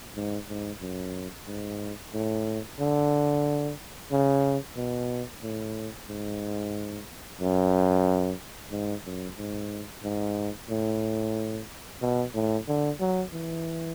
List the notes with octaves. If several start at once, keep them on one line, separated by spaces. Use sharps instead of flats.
G#2
G#2
F#2
G#2
A2
D3
C#3
B2
A2
G#2
F#2
G#2
F#2
G#2
G#2
A2
B2
A2
D3
F#3
E3